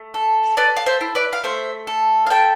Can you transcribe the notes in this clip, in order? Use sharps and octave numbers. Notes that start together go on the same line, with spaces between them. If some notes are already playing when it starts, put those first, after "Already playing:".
Already playing: A3
A4
A4 B4 D5
F5
C5 E5
E4
B4 D5
F5
A3 C5 E5
A4
F5
A4 E5 G5